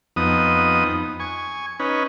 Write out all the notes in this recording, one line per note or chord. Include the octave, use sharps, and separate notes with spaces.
F2 B3 D#4 D#6
G#5 C#6
C#4 D#4 B4